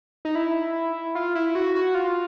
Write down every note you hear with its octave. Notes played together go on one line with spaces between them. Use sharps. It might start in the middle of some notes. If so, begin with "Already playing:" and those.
D#4
E4
F4
E4
F#4
F#4
F4